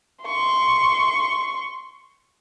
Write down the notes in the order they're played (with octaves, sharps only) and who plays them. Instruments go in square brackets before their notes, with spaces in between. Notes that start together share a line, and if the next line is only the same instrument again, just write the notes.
[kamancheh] C6 C#6